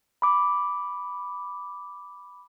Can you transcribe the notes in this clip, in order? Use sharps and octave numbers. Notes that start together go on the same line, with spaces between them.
B5 D6